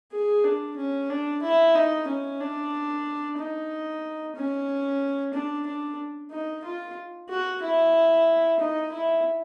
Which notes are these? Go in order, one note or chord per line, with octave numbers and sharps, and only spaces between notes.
G#4
D4
C#4
D4
E4
D#4
C#4
D4
D#4
C#4
D4
D4
D#4
F4
F#4
E4
D#4
E4